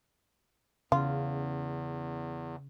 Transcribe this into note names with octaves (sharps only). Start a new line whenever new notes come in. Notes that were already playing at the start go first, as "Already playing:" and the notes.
E2 C#3 F4